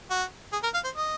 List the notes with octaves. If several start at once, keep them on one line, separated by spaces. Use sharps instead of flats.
F#4
G#4
A#4
F5
C5
D#5